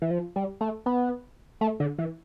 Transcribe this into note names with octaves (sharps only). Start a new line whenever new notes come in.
E3
F3
G3
A3
B3
A3
D3
E3